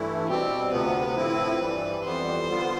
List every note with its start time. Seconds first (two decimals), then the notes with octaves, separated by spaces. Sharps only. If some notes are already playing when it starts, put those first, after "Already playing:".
Already playing: G2 E3 A3 E4
0.28 B2 G3 C4 G4
0.71 D2 C3 F3 B3 B4
1.16 A2 F3 C4 E4
1.60 G2 E3 G3
2.04 F2 E3 G3 B3 C5
2.48 D3 G3 B3 F4